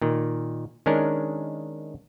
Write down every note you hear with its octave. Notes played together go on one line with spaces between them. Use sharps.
A#2 D#3
D#3 G#3 C#4 D4 A#4